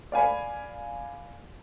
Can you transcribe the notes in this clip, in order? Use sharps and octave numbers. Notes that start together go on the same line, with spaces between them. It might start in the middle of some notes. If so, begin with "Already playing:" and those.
D5 F5 G#5 B5